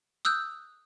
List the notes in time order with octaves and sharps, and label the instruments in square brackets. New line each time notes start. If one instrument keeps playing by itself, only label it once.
[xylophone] D#6 E6 F#6 G6